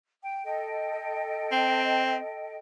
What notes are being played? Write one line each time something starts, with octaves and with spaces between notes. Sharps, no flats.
G5
A4 D#5 G5
C4